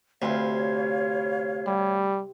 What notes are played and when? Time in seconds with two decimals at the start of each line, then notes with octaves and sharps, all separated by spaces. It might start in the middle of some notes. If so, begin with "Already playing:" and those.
0.22 D2 C3 C#5 F5 B5 C6
1.67 G3